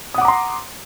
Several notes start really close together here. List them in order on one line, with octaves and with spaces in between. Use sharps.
D#6 F#5 D6 A#5 C6